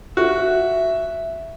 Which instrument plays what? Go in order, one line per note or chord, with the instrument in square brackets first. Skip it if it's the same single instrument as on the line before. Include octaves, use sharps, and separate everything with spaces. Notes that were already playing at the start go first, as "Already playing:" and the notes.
[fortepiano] F#4 [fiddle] E5